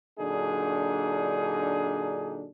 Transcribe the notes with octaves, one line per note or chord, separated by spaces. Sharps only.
A#2 D3 F#3 D4 D#4 G#4